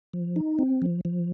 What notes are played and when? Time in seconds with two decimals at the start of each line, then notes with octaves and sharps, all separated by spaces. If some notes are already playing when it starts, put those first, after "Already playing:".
0.13 F3
0.36 D#4
0.59 C4
0.82 F3
1.05 F3